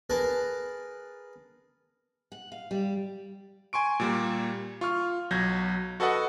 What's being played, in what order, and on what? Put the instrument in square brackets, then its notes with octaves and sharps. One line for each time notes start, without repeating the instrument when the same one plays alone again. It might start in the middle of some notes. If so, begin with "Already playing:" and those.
[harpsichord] G#4 A#4 B4 A5
[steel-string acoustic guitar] F#5
F5
G3
[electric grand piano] G#5 C6 C#6 D7
A#2 G3 A#3
F4 C#6 F6
B1 F#3 G6 G#6 A#6
F#4 A4 B4 D#5 F#5